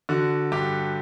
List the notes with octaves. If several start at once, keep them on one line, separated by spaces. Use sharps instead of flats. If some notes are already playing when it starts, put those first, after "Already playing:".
D3 F#4
G2 G4